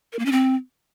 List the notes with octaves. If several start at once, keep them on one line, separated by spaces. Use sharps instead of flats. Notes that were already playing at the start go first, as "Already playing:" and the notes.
A#4
A#3
C#4
C4